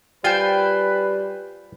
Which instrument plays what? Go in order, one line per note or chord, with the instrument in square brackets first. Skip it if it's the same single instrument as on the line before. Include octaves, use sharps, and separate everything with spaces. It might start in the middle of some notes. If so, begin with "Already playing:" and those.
[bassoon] G3 [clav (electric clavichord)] F4 C5 [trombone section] B4 [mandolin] G5 G#5